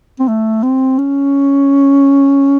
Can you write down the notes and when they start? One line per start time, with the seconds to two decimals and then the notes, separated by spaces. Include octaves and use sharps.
0.20 C4
0.28 A3
0.63 C4
0.99 C#4